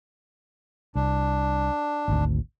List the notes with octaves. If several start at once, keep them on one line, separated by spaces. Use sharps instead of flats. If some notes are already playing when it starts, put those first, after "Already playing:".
C2 D4
G#1 D2